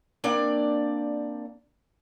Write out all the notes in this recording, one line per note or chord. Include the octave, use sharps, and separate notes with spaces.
A#3 C4 D4 D5